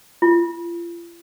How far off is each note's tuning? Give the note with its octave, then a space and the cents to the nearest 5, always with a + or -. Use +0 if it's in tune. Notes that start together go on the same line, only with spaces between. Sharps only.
F4 -35